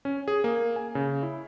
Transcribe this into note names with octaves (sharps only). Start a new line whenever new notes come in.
C#4
G#4
A#3
G#5
C#3
E4